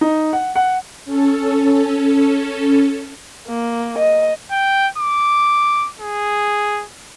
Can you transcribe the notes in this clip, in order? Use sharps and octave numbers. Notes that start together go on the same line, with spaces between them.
D#4
F#5
F#5
C#4 A4
A#3
D#5
G5
D6
G#4